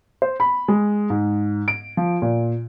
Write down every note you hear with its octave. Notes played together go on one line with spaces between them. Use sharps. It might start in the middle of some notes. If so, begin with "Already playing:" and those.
C5
B5
G#3
G#2
D7
F3
A#2